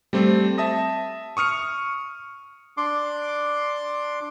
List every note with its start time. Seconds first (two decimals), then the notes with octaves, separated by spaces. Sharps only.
0.13 G3 A3 C4
0.58 E5 A5 D#6 A#6
1.37 C#6 D#6 F6 C#7
2.77 D4 C6 D6